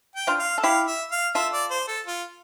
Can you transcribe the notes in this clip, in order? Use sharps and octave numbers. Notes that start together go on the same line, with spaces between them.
G5
D4 F4
F5
A4
E4 G4 F5
E5
F5
F4 A4 E5
D5
C5
A4
F4